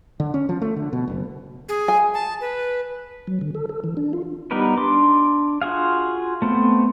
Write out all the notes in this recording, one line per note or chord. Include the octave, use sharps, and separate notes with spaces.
D3
C#4
F3
A3
D3
B2
F#1
G#4
G#5
A5
B4
F#3
D3
A4
A4
E3
D4
F4
G3 B3 D#4 A#4 B4
D4 C6 D6
F4 F#4 G#4 F5
A3 B3 C4